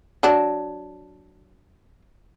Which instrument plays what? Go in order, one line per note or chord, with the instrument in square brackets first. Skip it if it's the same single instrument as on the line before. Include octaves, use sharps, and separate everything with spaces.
[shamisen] F#3 D4